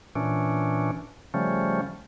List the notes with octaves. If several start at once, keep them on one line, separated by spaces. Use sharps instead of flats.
A#2 E3 C#4 D4
C#3 F3 G3 A3 C#4